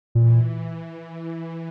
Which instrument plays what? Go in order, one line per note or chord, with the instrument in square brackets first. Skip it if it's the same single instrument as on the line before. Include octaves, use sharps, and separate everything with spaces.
[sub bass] A#2 [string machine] E3